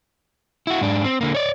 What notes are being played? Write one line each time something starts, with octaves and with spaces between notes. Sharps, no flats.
E4 F#4
G#2 D4
C4
D3 A#3
C#5 D5